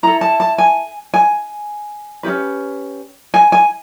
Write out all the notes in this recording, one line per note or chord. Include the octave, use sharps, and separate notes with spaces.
E4 A4 A#5
A5
A5
G#5
G#5
C#4 E4 G4 B4
G#5
G#5